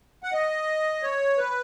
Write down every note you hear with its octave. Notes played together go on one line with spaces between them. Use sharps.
F#5
D#5
C#5
B4